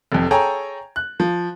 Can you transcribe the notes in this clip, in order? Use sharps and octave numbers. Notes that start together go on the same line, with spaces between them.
F1 F2
G#4 A4 C#5 G5 G#5 A#5
F#6
F3